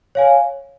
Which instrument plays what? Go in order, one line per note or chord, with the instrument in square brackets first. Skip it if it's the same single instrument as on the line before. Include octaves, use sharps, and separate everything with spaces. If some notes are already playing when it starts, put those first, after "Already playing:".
[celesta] C#5 F5 G#5